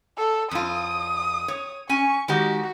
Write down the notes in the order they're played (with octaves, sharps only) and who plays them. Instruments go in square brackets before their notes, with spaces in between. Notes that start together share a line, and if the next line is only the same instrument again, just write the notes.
[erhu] A4
[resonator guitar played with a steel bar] F2 F4 [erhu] D#6
[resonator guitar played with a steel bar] C#5
[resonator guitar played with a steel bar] C#4 G#5 [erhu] C#6
[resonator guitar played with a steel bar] D#3 G#3 G4 [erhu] F#4